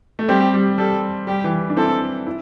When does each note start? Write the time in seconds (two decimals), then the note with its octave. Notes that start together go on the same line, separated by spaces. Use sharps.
0.19 A3
0.28 G3 C4 G4
0.54 G3
0.78 G3 A4
1.27 G3 G4
1.44 E3
1.70 D4
1.77 C4 E4 A4
2.27 E4